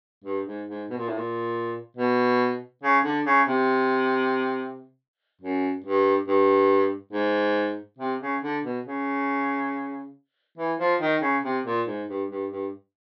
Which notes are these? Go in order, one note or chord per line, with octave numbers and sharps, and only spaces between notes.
G2
G#2
G#2
B2
A#2
A2
A#2
B2
C#3
D3
C#3
C3
F#2
G2
G2
G#2
C3
C#3
D3
B2
C#3
E3
F3
D#3
C#3
C3
A#2
G#2
G2
G2
G2